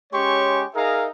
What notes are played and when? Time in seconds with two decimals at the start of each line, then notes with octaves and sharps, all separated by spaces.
0.13 G#3 C#4 G4 C#5 C6 C#6
0.74 D#4 G#4 A#4 E5 F5 A#5